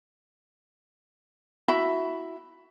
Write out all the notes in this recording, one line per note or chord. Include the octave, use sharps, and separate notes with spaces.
E4 F#4 E5 B5